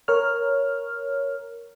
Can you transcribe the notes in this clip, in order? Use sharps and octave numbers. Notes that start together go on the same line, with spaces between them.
A#4 C#5 F6